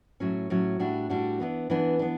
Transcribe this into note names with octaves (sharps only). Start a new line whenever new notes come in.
A2 F#3 C#4
A2 F#3 C#4
A2 G3 D4 F#4
A2 G3 D4 F#4
E3 B3 D4
E3 B3 D4
B3 D4